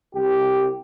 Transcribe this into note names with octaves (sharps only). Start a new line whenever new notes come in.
C2 G4